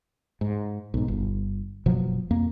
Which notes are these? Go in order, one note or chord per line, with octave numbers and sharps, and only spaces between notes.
G#2
B1 G#2
G1
F#1 B2 F3 F#3
F2 A#3